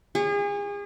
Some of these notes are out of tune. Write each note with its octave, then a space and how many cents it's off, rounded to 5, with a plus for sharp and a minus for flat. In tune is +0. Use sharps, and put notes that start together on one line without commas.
G#4 -35 C#5 +10